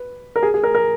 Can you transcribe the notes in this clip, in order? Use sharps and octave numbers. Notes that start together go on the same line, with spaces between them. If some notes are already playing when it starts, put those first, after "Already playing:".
Already playing: B4
A#4
G#4
G#4
A#4
A#4